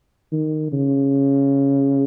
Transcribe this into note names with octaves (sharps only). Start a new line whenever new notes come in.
D#3
C#3